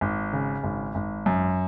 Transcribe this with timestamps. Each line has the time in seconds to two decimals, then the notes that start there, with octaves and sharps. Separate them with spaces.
0.01 G#1
0.33 C#3
0.63 G#1
0.95 G#1
1.26 F#2